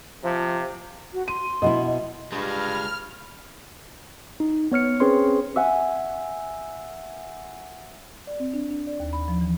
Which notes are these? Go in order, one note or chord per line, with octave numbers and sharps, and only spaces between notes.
C3 F3
F#4
C6 D#7
B2 B3 E4 D#5
G2 G#3 F4 B5 F6
D#4
B3 C#5 F6 C#7
C4 C#4 G#4 B4 C#5 C6
E5 F#5 G#5
D5
C4
D4
D4
D5
D#2
B5
F3
E3